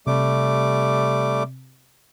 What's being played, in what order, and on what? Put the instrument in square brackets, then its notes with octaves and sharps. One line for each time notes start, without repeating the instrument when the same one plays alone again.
[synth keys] C3 [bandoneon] G3 A3 D6